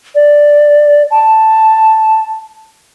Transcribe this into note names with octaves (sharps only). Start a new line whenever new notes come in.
D5
A5